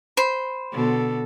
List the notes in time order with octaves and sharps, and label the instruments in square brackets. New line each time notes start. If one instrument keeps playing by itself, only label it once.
[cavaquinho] C5 B5
[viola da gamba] B2 D3 A4